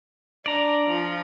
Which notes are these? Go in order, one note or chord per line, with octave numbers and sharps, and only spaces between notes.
D4 D5 A#5
F3